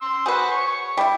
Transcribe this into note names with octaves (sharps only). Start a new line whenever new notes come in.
C6 E6
F#4 G#4 B4 C5
C#5 C#6
G3 E4